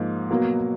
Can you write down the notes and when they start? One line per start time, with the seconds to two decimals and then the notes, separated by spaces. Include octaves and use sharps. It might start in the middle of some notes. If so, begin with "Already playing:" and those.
Already playing: G#2 F3 A#3
0.30 B2 F#3 A#3